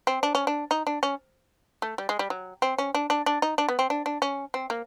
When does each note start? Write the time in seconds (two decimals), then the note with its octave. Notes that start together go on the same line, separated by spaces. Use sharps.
0.07 C4
0.23 D4
0.35 C#4
0.47 D4
0.71 D#4
0.87 D4
1.03 C#4
1.82 A3
1.98 G3
2.09 G#3
2.19 G3
2.30 F#3
2.62 C4
2.78 C#4
2.95 D4
3.10 D4
3.26 D4
3.42 D#4
3.58 D4
3.69 B3
3.79 C4
3.90 D4
4.06 D4
4.22 C#4
4.54 C4
4.70 A#3